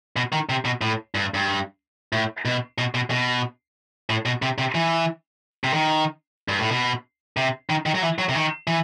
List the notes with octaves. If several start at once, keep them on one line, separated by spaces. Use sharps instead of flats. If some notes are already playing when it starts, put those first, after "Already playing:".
B2
D#3
C3
B2
A2
G2
G2
A2
B2
B2
B2
B2
A2
B2
C3
C3
E3
C3
D#3
G2
A2
B2
C3
D#3
D#3
F#3
E3
F#3
C3
D#3
E3